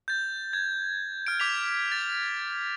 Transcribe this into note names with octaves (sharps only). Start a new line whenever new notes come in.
G6 A6
G#6
F6 D7
D6 G#6 B6 F7
A6